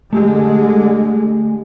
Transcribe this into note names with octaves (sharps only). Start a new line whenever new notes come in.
D3 G#3 A3 G4 G#4